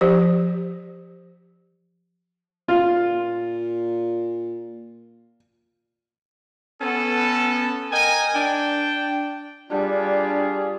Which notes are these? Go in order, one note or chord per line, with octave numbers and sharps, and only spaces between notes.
F3 G4 C5
A#2 F4
B3 C#4 A4
A#4 D#5 G5 G#5
D4 G5
G3 D4 F4 G#4